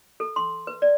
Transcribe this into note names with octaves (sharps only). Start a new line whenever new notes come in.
A4
C6
B4
D5